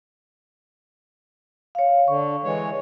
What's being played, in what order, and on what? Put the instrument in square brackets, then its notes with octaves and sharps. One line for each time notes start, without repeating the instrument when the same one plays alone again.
[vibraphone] C#5 F5
[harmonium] D3 [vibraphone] C#6
[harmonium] E3 G#3 C#5